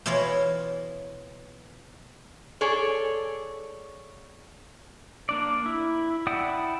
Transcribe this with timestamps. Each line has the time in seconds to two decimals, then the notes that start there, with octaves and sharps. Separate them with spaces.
0.06 B2 E3 E4 F4 C#5 F5
2.61 G#4 A4 C#5 D5
5.29 A#3 D4 D5
5.66 E4
6.27 E4 D5 F#5 G5 D#6